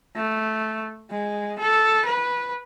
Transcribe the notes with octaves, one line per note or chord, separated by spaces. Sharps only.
A3
G#3
A4
B4